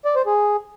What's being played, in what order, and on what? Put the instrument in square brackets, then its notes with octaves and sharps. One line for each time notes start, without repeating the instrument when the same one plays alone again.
[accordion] D5
C5
G#4